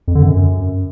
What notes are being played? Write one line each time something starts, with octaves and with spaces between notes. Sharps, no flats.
F2
D3
F#2